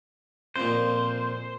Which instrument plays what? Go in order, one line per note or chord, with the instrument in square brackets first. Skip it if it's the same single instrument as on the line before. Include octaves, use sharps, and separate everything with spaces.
[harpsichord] F2 A#2 [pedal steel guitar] C5